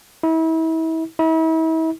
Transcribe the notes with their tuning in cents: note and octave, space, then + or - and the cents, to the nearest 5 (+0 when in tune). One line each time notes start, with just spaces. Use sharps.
E4 -35
E4 -40